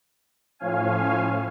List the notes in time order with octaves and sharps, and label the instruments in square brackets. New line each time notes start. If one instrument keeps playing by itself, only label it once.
[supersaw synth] A2 F3 C#4 F5 G#5